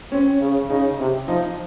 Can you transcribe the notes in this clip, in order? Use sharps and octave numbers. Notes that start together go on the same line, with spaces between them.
C4 C#4
C#3
C#3 D#4
C3
F3 D#4